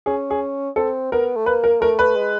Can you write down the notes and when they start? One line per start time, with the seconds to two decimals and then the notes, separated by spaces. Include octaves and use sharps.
0.06 C#4 G#4
0.30 G#4
0.76 C4 A4
1.12 B3 A#4
1.36 A3
1.46 A#3 B4
1.64 A#4
1.81 A3 A#4
1.99 B4
2.16 G#3